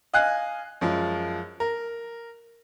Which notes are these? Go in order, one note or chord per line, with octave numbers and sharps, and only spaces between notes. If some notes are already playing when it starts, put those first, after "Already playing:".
D#5 F5 G#5 F#6
F#2 F3 G#3
A#4